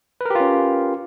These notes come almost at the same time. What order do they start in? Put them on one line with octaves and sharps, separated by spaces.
B4 A#4 G4 F4 C#4